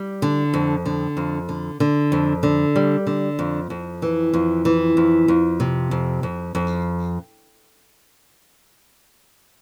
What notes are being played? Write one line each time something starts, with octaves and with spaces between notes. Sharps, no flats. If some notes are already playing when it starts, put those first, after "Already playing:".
Already playing: G3
D3
F2
D3
F2
D3
D3
F2
D3
G3
D3
F2
F2
E3
F2
E3
F2
F2
C3
F2
F2
F2